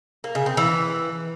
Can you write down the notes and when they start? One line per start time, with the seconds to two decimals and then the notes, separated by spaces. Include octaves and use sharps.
0.24 A#3
0.35 C#3
0.46 C4
0.57 E3